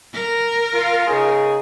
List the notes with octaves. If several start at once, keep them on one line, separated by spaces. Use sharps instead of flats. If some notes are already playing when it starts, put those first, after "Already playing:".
A#4
F4
C#3 D#4 G#4